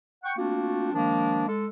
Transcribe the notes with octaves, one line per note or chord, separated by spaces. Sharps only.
F#5 G5 C#6
A3 A#3 C4 D4 F4 F#4
D#3 F3 G#3 A#3 D4
G#3 A4